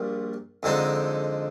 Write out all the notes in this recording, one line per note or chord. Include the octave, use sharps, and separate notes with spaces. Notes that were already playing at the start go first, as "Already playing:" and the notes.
Already playing: A#1 A#2 G3
F2 D3 G#3 D#4